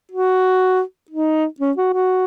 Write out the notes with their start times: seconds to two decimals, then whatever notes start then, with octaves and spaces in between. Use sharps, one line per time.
0.12 F#4
1.11 D#4
1.60 C#4
1.77 F#4
1.94 F#4